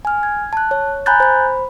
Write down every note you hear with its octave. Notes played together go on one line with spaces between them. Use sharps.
G#5 F6
G#6
A5 F#6
C#5
G#5 A#5 B5 F#6 G6 A6
C5 B5